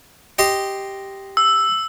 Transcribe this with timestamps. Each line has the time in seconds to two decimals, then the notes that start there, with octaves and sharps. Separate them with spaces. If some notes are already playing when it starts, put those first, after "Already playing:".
0.39 G4 D#5 C6
1.37 E6